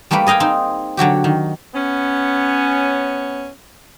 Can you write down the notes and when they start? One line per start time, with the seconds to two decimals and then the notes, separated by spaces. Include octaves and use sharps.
0.11 G3 A3 A#3 G4 B4
0.27 G#4 D#5 F5 G5 G#5
0.40 C4 D#4
0.97 D3 F#3 F#4 G4
1.24 D#3
1.75 B3 C#4